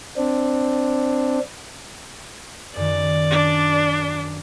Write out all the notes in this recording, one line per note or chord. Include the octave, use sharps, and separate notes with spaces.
C4 D4
F#2 D#3 D5
D4